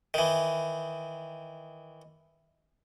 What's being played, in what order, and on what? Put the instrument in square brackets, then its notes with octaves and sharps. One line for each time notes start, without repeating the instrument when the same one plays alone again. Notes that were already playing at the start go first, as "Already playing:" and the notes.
[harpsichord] D#3 E3